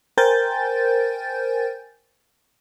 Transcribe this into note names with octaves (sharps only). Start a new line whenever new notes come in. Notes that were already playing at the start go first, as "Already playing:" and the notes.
A#4 C5 G5 G#5 G6 A6